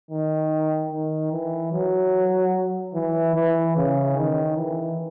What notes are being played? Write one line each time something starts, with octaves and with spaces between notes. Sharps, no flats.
D#3
D#3
E3
F#3
E3
E3
C#3
D#3
E3